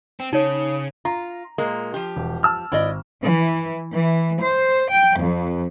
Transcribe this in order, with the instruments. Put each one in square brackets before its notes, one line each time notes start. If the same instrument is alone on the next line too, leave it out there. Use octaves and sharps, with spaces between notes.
[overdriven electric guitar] C4
[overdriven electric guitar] C#3 [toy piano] D#4 C#5
[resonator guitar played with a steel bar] F4 [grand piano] A#5
[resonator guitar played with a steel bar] A#2 G#3 A#3
F3 G4
[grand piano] E1
A5 E6 F6
[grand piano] G#1 [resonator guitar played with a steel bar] E4 D5 D#5
[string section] E3
E3
C5
G5
F2